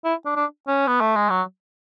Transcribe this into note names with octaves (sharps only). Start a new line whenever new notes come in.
E4
D4
D4
C#4
B3
A3
G#3
F#3